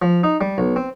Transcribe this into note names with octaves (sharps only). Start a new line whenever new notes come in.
F3
D#4
G3
B1
C4